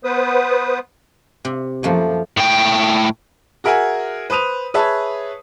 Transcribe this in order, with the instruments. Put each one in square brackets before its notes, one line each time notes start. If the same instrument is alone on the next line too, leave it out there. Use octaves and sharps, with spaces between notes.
[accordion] B3 B4 C5 D#6
[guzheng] C3
[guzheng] F#2 A3 A#3 [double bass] F3
[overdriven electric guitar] A2 G5
[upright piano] F#4 G#4 A#4 E5 F#5 G#5
B4 C5 D#6 D#7 F7
G#4 B4 C#5 E5 A5